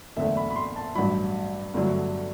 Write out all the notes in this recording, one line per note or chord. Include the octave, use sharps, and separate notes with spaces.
F#1 E2 D3 A3 E5
B5
B5
C6
A5
A1 G2 F#3 B5
G1 G2 D3 F#3 A3